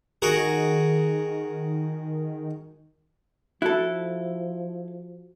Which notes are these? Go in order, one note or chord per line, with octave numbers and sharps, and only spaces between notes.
D#3 F#4 G#4 A#4
F3 E4 F#4 A4